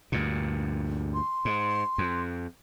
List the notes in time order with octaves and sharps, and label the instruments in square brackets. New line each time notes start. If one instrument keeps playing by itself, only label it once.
[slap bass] D2 G2 A#2
[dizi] C6
[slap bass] G#2
F2